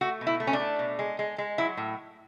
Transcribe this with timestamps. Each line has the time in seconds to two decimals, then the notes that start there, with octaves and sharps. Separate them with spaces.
0.01 A3 F#4
0.21 B2
0.27 E4
0.40 A3
0.47 C#4
0.53 D4
0.60 A3
0.79 B2
0.99 G#3
1.19 G#3
1.38 G#3
1.58 F#3 E4
1.77 A2